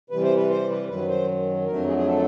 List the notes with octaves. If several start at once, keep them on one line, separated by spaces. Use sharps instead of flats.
C3 E3 G3 B4
C5
B4
C5
B4
F#2 D#3 F#3 B4
C5
F2 D3 F#3 A3 A#4
G#4
G#4
A4